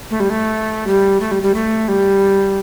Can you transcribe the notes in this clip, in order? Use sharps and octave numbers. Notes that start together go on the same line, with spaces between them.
A3
G3
A3
G3
A3
G3
G3
A3
G3